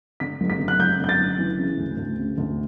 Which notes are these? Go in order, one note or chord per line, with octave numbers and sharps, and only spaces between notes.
D3 B6
F#1
B6
D3
F#6
F#1 G6
D3 G6
A6
F#1
E3
C#3
D2
D2
C#3
D2